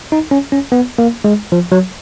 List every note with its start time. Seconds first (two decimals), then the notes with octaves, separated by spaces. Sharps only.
0.12 D#4
0.31 C#4
0.52 C#4
0.72 B3
0.98 A#3
1.24 G#3
1.52 F3
1.72 F#3